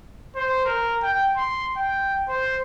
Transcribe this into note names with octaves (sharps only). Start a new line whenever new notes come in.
C5
A#4
G5
C6
G5
C5